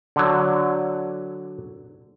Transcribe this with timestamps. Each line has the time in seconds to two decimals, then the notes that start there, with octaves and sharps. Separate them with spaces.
0.16 D3 F#3